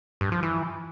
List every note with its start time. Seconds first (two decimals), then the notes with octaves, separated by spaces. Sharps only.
0.21 G2
0.32 F3
0.43 E3